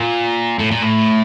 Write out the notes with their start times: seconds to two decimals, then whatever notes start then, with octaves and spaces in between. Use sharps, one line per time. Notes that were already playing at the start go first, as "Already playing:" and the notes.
Already playing: A#2
0.59 A2
0.71 A#2
0.82 A2